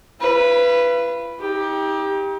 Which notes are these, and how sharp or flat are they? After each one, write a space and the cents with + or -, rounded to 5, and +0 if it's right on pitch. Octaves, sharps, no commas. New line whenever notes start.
F4 -45 B4 +0
D#4 +40 G4 +15